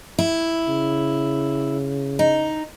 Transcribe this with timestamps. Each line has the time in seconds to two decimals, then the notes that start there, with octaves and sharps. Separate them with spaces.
0.19 E4
0.68 C#3
2.19 D#4